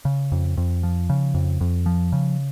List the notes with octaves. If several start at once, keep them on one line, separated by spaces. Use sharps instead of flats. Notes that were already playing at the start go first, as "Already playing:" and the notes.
C#3
F2
F2
F3
C#3
F2
F2
F3
C#3